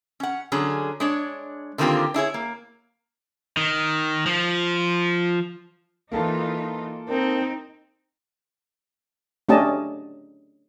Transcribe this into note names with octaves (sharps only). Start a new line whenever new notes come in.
C#4 F#5
D3 F#3 C#4 G#4
G#3 D4 C#5
D3 D#3 A#3 C4 F4 G4
D4 E4 G#4 C#5
A#3
D#3
F3
E3 A#3 D#4 F4 A4 A5
C4 D#4 A#4
A3 C#4 D4 G4 D#5 A5